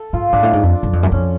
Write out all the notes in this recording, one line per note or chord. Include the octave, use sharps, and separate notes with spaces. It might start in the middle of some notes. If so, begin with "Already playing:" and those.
Already playing: A4
G#2 F4
G#2 D4
A2
G#2
F2
F#2
F2
F#2
F2 C#4